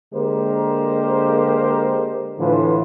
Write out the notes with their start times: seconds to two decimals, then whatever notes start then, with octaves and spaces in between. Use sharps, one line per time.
0.13 D3 G#3 A#3 G4 A#4 C5
2.39 A2 D3 E3 F4 B4 C5